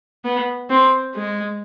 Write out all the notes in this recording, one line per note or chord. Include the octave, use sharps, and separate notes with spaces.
B3
C4
G#3